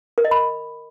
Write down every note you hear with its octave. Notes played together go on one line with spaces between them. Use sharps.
A#4
D#5
B5